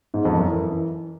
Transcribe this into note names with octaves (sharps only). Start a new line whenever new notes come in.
G#2
F2
F#2
E3